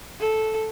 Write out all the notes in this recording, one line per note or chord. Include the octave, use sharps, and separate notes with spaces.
A4